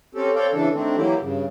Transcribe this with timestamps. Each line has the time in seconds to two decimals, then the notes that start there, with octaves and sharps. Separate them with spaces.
0.15 C4 C#4 G4 A4
0.36 C4 A4 C#5 D5 F5 G5
0.53 C#3 E3 D4 A4
0.73 D#3 A3 C4 D4
0.96 E3 F#3 A#3 E4 G4
1.20 G2 C#3